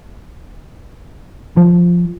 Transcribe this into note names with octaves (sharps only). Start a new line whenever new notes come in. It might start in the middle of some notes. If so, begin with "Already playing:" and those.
F3